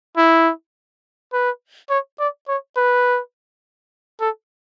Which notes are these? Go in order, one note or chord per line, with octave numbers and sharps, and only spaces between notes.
E4
B4
C#5
D5
C#5
B4
A4